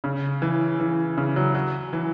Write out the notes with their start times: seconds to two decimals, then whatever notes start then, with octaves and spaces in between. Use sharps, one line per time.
0.04 C#3
0.42 E3
0.80 E3
1.17 C#3
1.36 F#3
1.55 F#3
1.93 E3